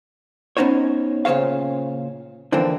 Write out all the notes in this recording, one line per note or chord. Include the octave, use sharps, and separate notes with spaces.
B3 C#4 D#4 C5 C#5
A#2 C#3 C5 C#5 F5
D3 E3 F3 A#3 C4